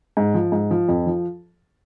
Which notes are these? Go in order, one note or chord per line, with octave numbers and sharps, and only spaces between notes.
G#2
F3
G#2
F3
F2
F3